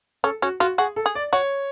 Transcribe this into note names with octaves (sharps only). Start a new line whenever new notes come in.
C#4 A4
C#4 F#4
F4 F#4
F#4 G#4
A4
G#4
D5
F#4 C#5